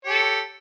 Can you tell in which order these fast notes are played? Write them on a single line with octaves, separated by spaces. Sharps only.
C#5 G4 A4